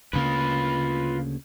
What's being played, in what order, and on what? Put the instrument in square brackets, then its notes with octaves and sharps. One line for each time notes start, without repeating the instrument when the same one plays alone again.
[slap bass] D2 C#3 A#3 [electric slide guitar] F4 B4